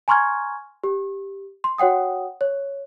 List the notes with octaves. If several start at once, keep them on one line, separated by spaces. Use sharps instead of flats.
G#5 A#5 C6 C#6 F6 G#6
G4
C6
F#4 C#5 F#5 G5 D#6
C#5